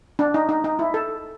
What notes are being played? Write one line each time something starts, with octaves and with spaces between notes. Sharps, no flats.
D4
D#4
D#4
D#4
E4
A4